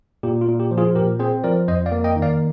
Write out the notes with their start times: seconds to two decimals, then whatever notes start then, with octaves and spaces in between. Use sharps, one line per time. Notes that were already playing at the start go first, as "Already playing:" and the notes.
0.23 A#2 G4
0.41 F4
0.48 A#2
0.60 G4
0.71 F3
0.78 F4 G#4
0.95 A#2 G4 A#4
1.19 C4 G#4 C5
1.44 F3 A#4 D5
1.68 F2 C5 D#5
1.86 D5 F5
1.92 A#3
2.04 D#5 G5
2.16 D#3
2.22 D5 F5